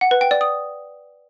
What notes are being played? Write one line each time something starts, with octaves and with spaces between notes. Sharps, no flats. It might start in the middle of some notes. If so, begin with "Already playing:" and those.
F#5
B4
G5
D5
D#6